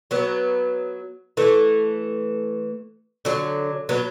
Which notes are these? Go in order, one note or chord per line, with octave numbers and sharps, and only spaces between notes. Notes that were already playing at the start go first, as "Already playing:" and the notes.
F#3 B3
E3 A3
D3 F#3
F#3 B3